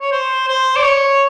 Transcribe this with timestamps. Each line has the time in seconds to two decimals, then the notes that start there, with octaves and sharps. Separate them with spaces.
0.01 C#5
0.12 C5
0.48 C5
0.76 D5
0.84 C#5